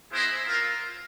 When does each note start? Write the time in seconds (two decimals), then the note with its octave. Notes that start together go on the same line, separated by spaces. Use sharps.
0.11 B3 E4 G#4 C5 D#5
0.46 C4 F4 A#4